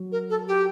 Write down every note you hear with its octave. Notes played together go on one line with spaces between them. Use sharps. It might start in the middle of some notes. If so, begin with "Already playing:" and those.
Already playing: F#3
A#4
A4
G4